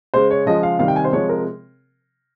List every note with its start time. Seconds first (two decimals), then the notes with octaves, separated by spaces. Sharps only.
0.14 C#3 G#3 C5
0.31 C#5
0.46 C#3 F3 G#3 D#5
0.63 F5
0.79 C3 D#3 G3 F5
0.88 G5
0.96 G#5
1.04 C5
1.13 C3 F3 G#3 C#5
1.29 A#4